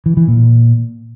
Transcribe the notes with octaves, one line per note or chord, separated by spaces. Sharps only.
E3
E3
A#2